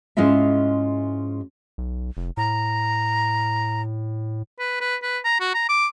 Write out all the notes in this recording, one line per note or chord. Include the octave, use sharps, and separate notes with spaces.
G#2 G#3 C#4 E4 F4 E5
B1
F1
A2 A#5
B4
B4
B4
A#5
F#4
A#5
D6